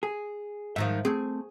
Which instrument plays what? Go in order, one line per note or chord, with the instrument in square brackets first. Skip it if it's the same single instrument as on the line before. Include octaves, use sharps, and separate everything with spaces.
[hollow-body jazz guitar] G#4
[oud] G#2 D#3 F3 [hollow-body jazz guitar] E5
[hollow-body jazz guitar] A3 C4 [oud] G#4